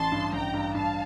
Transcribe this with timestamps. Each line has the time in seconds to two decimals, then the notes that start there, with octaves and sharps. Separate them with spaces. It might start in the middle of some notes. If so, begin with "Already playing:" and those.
Already playing: A1 A5 C6
0.12 G2
0.33 A1 G5 A#5
0.54 G2
0.75 G2 F5 A5